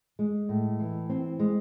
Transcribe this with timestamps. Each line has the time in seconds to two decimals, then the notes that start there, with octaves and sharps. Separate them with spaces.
0.19 G#3
0.49 A2
0.80 E3
1.09 C4
1.40 G#3